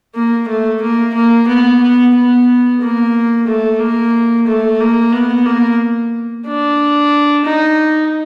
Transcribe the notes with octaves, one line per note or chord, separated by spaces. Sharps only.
A#3
A3
A#3
A#3
B3
B3
B3
A#3
A3
A#3
A3
A#3
B3
A#3
D4
D#4